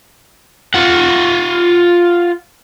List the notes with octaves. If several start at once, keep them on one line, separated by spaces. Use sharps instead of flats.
F4 F#5